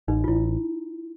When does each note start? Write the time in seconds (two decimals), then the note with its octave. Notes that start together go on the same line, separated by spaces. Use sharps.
0.08 A1 D#4
0.24 F4
0.28 A1 E4